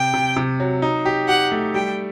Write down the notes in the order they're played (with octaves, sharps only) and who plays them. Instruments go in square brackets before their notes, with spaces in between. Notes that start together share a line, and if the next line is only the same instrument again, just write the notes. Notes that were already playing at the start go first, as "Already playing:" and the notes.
Already playing: [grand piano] C3 [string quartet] G5
[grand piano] C3
C3
F#3
D#4
G4
[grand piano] G4 [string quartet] F#5
[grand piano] A3
[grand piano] G3 [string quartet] G5